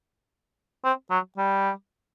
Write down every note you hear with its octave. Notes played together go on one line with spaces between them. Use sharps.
C4
F#3
G3